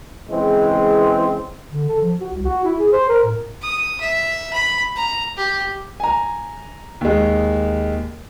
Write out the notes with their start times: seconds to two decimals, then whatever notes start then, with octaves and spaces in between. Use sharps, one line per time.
0.30 C#3 E3 G#3 C4
1.71 D3
1.89 A4
2.01 F3
2.21 F#4
2.32 C2
2.45 F#4
2.65 E4
2.79 G#4
2.93 C5
3.09 A#4
3.24 A2
3.62 D#6
4.00 E5
4.53 B5
4.96 A#5
5.37 G4
6.00 G#5 A#5
7.01 D#2 G#3